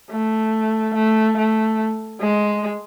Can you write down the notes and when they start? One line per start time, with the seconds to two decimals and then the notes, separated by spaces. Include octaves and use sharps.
0.11 A3
0.95 A3
1.38 A3
2.22 G#3